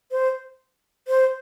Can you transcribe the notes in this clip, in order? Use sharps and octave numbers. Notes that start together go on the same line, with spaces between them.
C5
C5